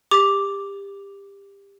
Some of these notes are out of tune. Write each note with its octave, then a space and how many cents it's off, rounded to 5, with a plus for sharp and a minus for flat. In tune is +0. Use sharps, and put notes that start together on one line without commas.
G4 +25 D6 +0